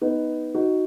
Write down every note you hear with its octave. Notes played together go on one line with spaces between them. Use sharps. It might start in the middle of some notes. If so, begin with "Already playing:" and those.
B3 D#4
D#4 F#4